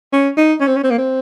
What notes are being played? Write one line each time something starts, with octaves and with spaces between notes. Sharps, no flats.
C#4
D#4
C#4
C4
C#4
C4
A#3
C4